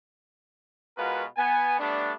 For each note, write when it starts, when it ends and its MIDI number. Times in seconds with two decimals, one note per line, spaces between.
0.97 1.24 47
0.97 1.24 56
0.97 1.24 65
0.97 1.24 66
0.97 1.24 70
0.97 1.24 71
1.37 1.76 59
1.37 1.76 80
1.79 2.12 55
1.79 2.12 57
1.79 2.12 59
1.79 2.12 62